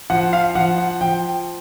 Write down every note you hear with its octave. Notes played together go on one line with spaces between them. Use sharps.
F3 F#5
F5
F3 F#5
F#5
F3 G5